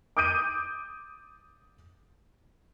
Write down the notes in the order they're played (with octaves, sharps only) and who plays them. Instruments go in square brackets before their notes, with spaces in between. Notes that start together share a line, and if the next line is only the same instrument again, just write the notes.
[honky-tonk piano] D6 D#6 G6 D7 D#7